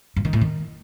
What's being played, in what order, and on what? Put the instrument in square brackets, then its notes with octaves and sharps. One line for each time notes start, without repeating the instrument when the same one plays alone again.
[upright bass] G2
D#3
A2
D#3